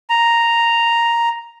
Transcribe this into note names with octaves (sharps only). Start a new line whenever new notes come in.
A#5